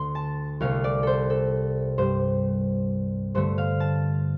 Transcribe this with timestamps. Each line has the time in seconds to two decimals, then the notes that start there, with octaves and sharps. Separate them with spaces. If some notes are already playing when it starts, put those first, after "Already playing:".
Already playing: D2 D3 C6
0.15 A5
0.60 C2 C3 A3 F5
0.84 D5
1.03 A4 C5
1.30 A4
1.98 G2 G3 C5
3.35 G2 D3 A3 C5
3.58 F5
3.80 A5